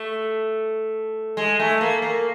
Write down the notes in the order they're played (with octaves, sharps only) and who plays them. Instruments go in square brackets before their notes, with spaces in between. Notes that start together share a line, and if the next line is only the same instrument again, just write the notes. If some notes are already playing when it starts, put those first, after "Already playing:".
Already playing: [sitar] A3
G#3
A3
A#3
A#3